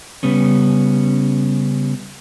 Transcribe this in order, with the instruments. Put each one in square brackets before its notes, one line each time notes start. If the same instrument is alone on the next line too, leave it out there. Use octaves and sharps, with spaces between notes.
[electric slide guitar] C#3 G3 B3 C#4